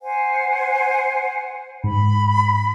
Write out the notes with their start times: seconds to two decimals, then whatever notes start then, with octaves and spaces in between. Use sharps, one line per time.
0.01 C5 F#5 G#5
1.84 G#2 B5